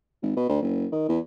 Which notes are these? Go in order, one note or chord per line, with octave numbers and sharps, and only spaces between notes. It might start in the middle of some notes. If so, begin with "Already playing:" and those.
G#1
B2
D2
F#1
D#3
E2